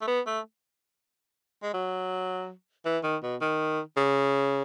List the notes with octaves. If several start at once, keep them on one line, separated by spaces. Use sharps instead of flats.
A3
B3
A3
G#3
F#3
E3
D#3
B2
D#3
C#3